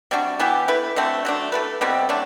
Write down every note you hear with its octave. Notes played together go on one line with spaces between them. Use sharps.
C3 G3 D4 F#4
E3 B3 E4 G4
A3 E4 B4
D3 A3 C4 F#4
F#3 A3 D4
A3 E4 B4
B2 G3 C4 E4
C3 F#3 A3 D4